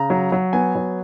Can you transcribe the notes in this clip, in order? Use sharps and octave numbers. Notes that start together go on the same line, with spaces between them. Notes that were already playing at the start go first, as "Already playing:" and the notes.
Already playing: C#3 A#5
F#3
F#3
B3 G#5
F#3